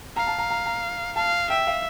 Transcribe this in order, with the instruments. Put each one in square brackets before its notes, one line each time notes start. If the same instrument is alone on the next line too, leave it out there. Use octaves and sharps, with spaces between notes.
[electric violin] F5 [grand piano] A#5
[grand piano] A5
A#5
A#5
A#5
[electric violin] F5 [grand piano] A5
[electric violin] E5 [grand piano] G5
[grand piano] F5